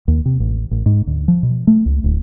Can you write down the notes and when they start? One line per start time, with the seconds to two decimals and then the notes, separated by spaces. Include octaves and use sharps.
0.08 D#2
0.26 C3
0.40 A1
0.71 A1
0.86 G#2
1.07 D2
1.28 F3
1.43 B2
1.67 A3
1.86 C#2
2.04 D1